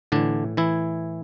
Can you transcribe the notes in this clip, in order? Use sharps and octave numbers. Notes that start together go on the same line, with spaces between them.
A2 D3 E3 D4
E3 E4